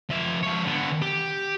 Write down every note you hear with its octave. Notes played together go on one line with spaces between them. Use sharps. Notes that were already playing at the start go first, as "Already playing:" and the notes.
F3 E5
F3 C#5
D3 B3
G4